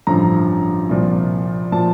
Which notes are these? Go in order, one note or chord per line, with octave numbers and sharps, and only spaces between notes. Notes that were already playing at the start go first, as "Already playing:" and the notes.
A1 G2 D3 F3 A#5
C2 A#2 F3
A#2 F3 A5